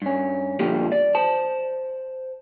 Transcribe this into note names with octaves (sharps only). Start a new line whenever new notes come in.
G2 C#4
A#2 D3 F3 G3 G4
D5
C5 A5